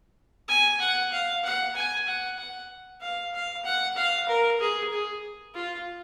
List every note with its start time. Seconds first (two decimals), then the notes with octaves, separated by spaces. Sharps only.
0.48 G#5
0.80 F#5
1.12 F5
1.44 F#5
1.75 G#5
2.07 F#5
2.38 F#5
3.01 F5
3.34 F5
3.64 F#5
3.96 F5
4.28 A#4
4.60 G#4
4.92 G#4
5.54 F4